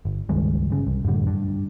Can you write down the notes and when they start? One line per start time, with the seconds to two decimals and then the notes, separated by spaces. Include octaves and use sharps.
0.05 G1
0.29 C#2 G2 D#3 G#3
0.70 G1 C#3
0.87 C2
1.05 F#2 A2 D3 G3
1.27 G2